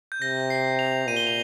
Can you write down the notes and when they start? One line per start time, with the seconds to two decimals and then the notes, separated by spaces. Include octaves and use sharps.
0.12 G6
0.22 C3 A#6
0.50 C7
0.79 F7
1.07 A#2 D#7
1.17 G7
1.27 F7